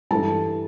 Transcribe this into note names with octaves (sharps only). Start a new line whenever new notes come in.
G2 E3 G3 A4 A5